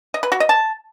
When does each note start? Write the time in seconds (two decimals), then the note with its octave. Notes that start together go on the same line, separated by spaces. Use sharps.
0.14 D#5
0.23 B4
0.32 F#4
0.40 D#5
0.49 A5